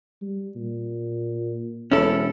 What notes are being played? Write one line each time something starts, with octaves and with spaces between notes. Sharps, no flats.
G3
A#2
E1 C#4 E4 A4